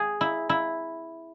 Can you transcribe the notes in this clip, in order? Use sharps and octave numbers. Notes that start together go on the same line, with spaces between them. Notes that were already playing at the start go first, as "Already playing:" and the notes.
Already playing: G#4
E4
E4